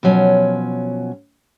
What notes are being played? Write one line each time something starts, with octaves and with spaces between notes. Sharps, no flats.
B2 F3 F#3 C#4